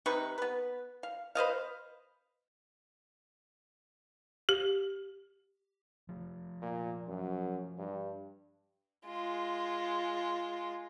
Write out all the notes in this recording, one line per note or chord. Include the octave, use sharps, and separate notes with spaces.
C3 D#4 B4 C#6
B3 B4
F5
B4 C5 D#5 F5
G4
F3 A3
A#2
F#2
G2
G#3 F4